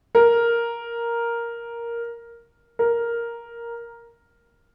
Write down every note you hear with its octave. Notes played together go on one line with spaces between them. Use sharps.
A#4
A#4